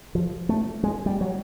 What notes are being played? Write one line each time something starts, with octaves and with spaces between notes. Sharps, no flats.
F3
A3
G#3
G3
F#3